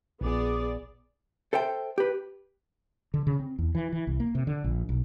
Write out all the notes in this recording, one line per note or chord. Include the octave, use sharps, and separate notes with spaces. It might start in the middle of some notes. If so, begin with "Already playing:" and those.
A#1 B3 G#4 D5
A4 C5 E5 G5
G4 B4
D3
C#3
C4
E2
E3
E3
C2
A#3
C3
D3
A#1
B1